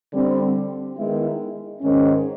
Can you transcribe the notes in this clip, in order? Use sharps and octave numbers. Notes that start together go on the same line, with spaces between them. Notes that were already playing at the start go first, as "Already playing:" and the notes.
D3 G3 C4
D#3 G#3 B3 E4
G#2 D#3 G#3 C#4